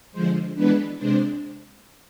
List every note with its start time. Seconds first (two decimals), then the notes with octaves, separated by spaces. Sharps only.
0.12 D3 F3 G#3 C5
0.55 E3 G#3 B3 D4 B4
0.97 C3 G#3 D4 C5